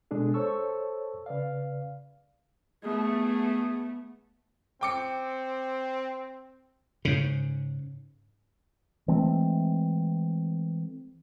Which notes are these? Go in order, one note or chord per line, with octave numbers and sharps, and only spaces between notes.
B2 G#3 D4 G#4 A4
A4 C5 C#5 A5 C#6 E6
C#3 B4 D5 F5
A3 B3 G#4
C4 G5 D6 C#7
G#2 C#3
E3 G#3 A3 C4